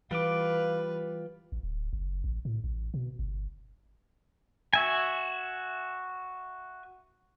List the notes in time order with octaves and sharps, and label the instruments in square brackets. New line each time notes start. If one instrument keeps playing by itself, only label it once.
[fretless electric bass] E3 [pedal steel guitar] G3 F4 D6 [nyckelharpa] B4 [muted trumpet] F5
[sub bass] G#1
D1
F#1
A1
A2
A1
B2
G1
[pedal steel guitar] F#4 E5 G#5